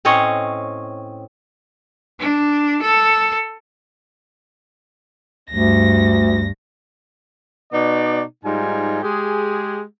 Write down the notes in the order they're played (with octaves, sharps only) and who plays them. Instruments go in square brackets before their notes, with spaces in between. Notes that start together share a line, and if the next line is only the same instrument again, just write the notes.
[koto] A2 C4 C#4 C#5 D#5
[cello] D4
A4
[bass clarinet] D2 [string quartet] G2 A#6
[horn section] B2 B3 D#4 D5
G#2 G3 D#4 F4 G#5
G#3 G4 G#4